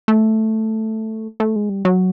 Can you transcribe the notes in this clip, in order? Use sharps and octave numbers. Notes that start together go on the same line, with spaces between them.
A3
A3
G#3
G3
F#3